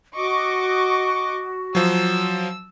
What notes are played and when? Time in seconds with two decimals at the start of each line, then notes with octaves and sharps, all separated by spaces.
0.15 F#4 D#5 C#6 D6
1.75 F3 F#3 E6